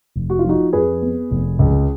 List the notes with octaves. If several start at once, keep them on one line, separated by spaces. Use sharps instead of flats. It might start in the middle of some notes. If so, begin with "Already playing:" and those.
F1
F#4
F4
F3 D#4 F#4
F2 G#4 B4
B3
F1
C#2